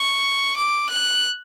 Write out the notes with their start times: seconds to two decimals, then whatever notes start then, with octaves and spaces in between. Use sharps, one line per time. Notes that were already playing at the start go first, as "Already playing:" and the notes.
Already playing: C#6
0.57 D6
0.90 F#6